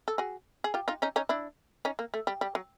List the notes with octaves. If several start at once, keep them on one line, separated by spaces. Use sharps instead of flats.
A4
F#4 G#4
G#4
F4 G4
D#4 F4
C#4 D#4
C#4 D#4
D4 E4
C#4 D#4
A#3
A3
G3
G3
F#3